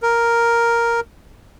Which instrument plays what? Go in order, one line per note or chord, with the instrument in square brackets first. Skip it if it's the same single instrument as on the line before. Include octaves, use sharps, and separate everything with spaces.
[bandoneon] A#4